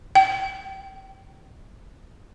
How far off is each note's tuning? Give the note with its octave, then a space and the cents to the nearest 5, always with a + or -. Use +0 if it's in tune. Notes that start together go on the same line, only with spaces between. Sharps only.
G5 -30